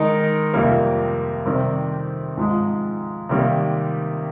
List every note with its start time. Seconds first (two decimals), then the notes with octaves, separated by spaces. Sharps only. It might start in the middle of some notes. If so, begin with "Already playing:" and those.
Already playing: D#3 G#3 D#4 A#4
0.54 F2 C3 G3 A#3
1.46 C3 D#3 G3 C4
2.37 G#2 F3 G#3
3.29 C3 D#3 G3 A#3